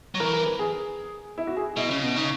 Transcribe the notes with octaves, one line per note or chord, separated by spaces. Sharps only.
F#3
E3 A#4
A#4
B4
G#4
E4
F#4
G#4
B2 E4
C#3
B2
C#3 D#4